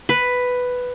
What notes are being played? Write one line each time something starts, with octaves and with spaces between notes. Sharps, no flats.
B4